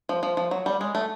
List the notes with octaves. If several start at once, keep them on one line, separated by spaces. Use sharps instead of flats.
F3
F3
F3
F#3
G3
G#3
A3